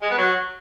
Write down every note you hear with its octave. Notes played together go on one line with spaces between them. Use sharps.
G#3
B3
F#3